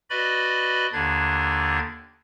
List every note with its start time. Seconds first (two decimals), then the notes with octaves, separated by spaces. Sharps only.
0.10 F#4 B4 D5 D#5 B5
0.93 D#2 D3 D4 G#6